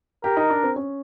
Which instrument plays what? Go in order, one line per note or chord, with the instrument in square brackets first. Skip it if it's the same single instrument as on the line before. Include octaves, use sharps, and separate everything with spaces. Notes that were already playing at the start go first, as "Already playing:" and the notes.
[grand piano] G4 [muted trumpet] A#4
[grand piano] D#4
D4
C4
C#4